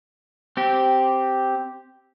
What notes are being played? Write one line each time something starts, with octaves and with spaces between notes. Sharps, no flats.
C4 G4